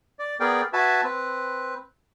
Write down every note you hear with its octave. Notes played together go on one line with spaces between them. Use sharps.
D5
B3 G#4 A#4 D5 G5
F#4 B4 E5 G#5 A5 B5
C4 B4